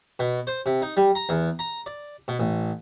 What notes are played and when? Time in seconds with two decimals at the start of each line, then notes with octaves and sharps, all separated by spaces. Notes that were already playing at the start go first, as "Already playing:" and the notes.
0.19 B2
0.47 C5
0.66 C3
0.82 D#4
0.97 G3
1.15 A#5
1.29 E2
1.59 A#5
1.86 D5
2.28 B2
2.39 A1